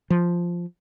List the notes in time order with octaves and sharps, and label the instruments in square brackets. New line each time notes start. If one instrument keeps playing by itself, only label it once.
[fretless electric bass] F3